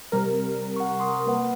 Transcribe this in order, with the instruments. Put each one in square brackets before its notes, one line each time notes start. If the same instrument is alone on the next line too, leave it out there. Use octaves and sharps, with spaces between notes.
[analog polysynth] C3 G3 A#4
[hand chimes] F#5 C#6
C6 D#6
A#3 B4 F#5